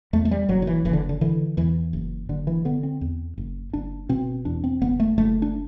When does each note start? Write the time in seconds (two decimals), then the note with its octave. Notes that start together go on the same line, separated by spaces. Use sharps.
0.13 E2 A3
0.25 A3
0.31 G3
0.49 F#1 F#3
0.62 D3
0.67 E3
0.85 F#1 E3
0.93 D3
1.09 D3
1.21 D3 E3
1.57 E2 E3
1.93 F#1
2.29 F#1 D3
2.47 E3
2.65 D3 B3
2.83 C4
3.01 E2
3.38 F#1
3.73 F#1 D4
4.09 B2 C4
4.45 E2 D4
4.64 C4
4.81 F#1 B3
5.00 A3
5.18 F#1 A3
5.42 D4